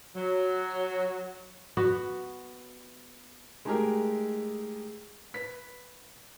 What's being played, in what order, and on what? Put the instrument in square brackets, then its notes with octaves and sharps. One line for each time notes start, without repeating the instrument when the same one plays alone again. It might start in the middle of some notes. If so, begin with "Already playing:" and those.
[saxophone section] F#3
[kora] B3 F#4
[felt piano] G#3 A3 D#4 G4 G#4 A#4
B4 B6